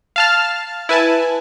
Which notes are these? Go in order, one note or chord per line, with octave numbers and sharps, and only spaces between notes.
F5 A5 F6
E4 B4 G#5 A5